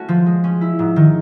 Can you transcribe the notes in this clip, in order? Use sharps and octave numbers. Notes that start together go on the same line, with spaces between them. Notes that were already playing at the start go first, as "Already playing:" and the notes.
Already playing: A3 C#4 F#4
F3
G#3
C#4
E4
G#2
D#3